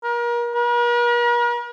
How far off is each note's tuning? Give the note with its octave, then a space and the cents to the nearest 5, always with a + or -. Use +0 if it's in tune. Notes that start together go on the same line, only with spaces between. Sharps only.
A#4 +35
A#4 +45